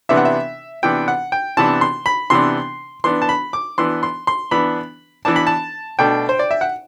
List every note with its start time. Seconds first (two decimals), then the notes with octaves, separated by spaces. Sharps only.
0.09 C3 E3 B3 D4 E5
0.17 F#5
0.25 E5
0.83 C3 E3 B3 D4 G5
1.08 F#5
1.32 G5
1.57 C3 E3 B3 D4 A5
1.81 C6
2.06 B5
2.30 C3 E3 B3 D4 C6
3.04 E3 B3 D4 C6
3.22 A5
3.29 B5
3.53 D6
3.78 E3 B3 D4 C6
4.03 C6
4.27 C6
4.51 E3 B3 D4 B5
5.25 E3 B3 D4 A5
5.36 B5
5.47 A5
5.99 B2 A3 D4 G5
6.29 C5
6.39 D5
6.51 E5
6.61 F#5